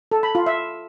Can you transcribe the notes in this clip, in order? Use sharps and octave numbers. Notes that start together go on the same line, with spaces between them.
A4
B5
F4
E5